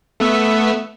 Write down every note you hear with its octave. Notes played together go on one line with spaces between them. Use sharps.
A3 B3 E5